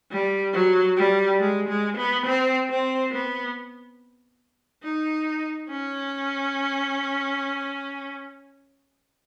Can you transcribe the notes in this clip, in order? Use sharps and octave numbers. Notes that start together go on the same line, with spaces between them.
G3
F#3
G3
G#3
G#3
B3
C4
C4
B3
D#4
C#4